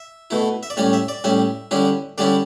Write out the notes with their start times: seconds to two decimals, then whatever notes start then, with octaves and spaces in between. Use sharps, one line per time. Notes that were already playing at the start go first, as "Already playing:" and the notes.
Already playing: E5
0.30 B2 A3 E4
0.63 E5
0.70 D5
0.77 A2 G3 C#4 C#5
0.93 E5
1.08 D5
1.24 A2 G3 C#4 E5
1.71 D3 G3 C#4 E4
2.18 D3 G3 C#4 E4 D5